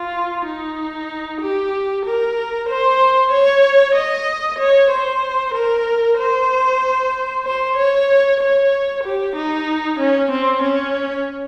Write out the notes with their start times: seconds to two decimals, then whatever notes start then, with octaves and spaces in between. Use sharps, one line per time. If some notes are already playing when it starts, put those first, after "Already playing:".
Already playing: F4
0.46 D#4
1.41 G4
2.06 A#4
2.69 C5
3.31 C#5
3.95 D#5
4.59 C#5
4.91 C5
5.54 A#4
6.18 C5
7.45 C5
7.77 C#5
8.40 C#5
9.03 G4
9.36 D#4
9.99 C#4
10.31 C4
10.62 C#4